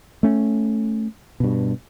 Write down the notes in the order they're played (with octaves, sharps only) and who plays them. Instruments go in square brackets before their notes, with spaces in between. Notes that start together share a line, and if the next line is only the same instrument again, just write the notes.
[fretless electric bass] A3 C#4
G2 B2